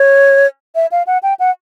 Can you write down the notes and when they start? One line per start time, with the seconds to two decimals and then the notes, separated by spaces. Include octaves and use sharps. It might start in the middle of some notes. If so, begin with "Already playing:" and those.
Already playing: C#5
0.75 E5
0.92 F5
1.07 F#5
1.23 G5
1.39 F#5